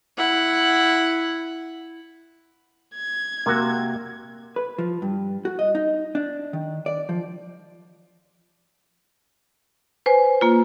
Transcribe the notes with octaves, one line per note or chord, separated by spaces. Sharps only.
E4 F#5
G#6
C3 A#3 F#4
B4
F3
G2
F#4
D#5
D#4
D4
D#3
D5
F3
B4 C5 G#5
A#3 F4